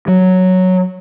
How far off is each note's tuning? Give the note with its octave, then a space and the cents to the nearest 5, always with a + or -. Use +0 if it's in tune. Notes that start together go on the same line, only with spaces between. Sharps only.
F#3 +0